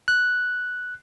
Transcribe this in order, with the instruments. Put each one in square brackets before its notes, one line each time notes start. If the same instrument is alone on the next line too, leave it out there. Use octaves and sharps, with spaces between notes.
[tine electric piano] F#6